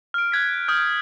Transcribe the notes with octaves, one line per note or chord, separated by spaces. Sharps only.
F6 D7
F#6 G#6 B6
D#6 F6 G6